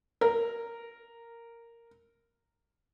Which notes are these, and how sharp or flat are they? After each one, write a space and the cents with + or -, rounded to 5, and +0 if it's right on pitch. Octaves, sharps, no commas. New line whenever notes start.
A#4 -5